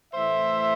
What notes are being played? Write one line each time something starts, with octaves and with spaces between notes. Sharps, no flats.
A2 E3 A3 C5 E5